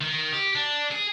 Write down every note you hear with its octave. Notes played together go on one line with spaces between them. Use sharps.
D#3
G4
D4
G#4